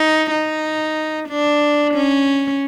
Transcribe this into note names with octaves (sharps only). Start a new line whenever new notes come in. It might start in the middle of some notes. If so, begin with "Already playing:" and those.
Already playing: D#4
D#4
D4
C#4